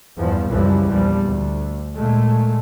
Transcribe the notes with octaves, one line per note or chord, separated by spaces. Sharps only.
E2 G2 F3
C#2 F#2 E3 F3 G3
A#1 E2 F3 G3
D2
A#2 G#3 A3